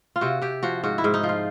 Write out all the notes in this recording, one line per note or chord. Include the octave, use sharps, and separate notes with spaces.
F4
C3 F#4
C3 G4
F3 F#4
G#2 F#4
E4
G#2
D#4
F3
F4